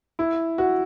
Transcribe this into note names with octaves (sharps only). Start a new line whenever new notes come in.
E4
F#4